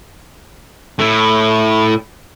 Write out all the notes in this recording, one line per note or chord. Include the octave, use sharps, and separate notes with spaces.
A2 E4